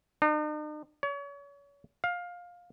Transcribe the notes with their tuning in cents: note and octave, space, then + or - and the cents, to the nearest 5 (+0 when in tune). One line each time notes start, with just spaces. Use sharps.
D#4 -45
C#5 +35
F5 +20